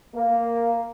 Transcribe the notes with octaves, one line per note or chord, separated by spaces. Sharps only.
A#3